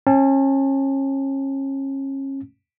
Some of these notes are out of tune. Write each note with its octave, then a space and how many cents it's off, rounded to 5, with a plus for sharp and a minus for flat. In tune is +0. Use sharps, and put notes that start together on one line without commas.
C#4 -35 A5 +0